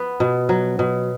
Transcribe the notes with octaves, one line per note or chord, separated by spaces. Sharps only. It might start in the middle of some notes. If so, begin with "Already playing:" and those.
Already playing: B3 B4
B2
F#3
B2